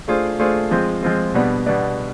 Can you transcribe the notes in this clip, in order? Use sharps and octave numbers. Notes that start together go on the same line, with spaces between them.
A3 D4 F4 G#4 C5
A3 D4 F4 G#4 C5
F3 G#3 C4 F4
F3 G#3 C4 F4
B2 G3 B3 D4
B2 G3 B3 D4